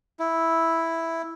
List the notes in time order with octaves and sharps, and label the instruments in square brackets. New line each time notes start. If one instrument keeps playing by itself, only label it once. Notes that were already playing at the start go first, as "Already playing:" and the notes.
[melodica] E4